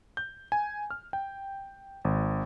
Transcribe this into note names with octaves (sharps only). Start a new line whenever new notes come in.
G6
G#5
F6
G5
G#1